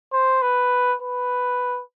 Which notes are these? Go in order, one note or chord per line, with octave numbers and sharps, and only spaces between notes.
C5
B4
B4